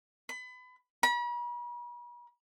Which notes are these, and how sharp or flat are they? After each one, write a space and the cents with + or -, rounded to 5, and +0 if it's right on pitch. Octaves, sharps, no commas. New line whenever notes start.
B5 +30
B5 -45